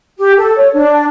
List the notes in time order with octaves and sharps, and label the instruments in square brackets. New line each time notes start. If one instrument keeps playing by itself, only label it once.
[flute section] G4
A4
C#5
D4